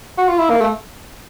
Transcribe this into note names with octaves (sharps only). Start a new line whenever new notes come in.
F#4
F4
E4
A#3
A3